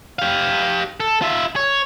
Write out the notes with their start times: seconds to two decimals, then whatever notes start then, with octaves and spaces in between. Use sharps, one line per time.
0.19 G4 F5
1.00 A4
1.22 F4 E5
1.56 C#5